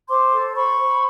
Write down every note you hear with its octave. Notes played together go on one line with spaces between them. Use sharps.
C5 C6 D6
A4
C5 B5 C#6
C5